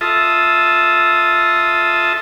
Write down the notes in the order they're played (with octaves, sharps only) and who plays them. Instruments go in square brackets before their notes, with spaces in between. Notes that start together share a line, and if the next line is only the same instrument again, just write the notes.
[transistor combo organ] F4 A4 E5 A5 D#6